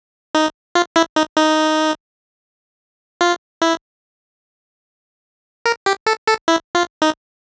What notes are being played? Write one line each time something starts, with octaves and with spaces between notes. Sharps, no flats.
D#4
F4
E4
D#4
D#4
F4
E4
A#4
G4
A4
A4
E4
F4
D#4